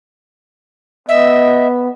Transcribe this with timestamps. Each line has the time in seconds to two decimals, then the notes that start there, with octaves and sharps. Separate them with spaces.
1.09 B3 D#5 E5